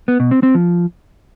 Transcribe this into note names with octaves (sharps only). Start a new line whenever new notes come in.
B3
B2
C4
C4
F3